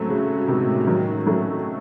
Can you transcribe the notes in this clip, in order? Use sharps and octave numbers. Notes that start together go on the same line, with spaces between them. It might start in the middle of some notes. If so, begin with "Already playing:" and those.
Already playing: A2 F#3 G#3 A3 C4 C#4 F#4
C#3
C3 D#3
D#3 F#3
F#3 A3